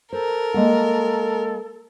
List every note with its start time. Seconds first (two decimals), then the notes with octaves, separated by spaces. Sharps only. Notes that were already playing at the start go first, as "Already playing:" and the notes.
0.13 A4 A#4 C5
0.54 G#3 A#3 F#5